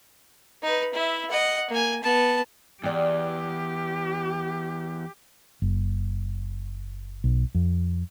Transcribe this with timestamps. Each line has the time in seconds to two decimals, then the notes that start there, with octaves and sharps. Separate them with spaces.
0.63 D#4 B4
0.93 E4 E5
1.30 D#5 F#5
1.70 A#3 G#5
2.03 B3 A5
2.83 E2 G4 D5 G5
5.62 F#1
7.24 B1
7.55 F2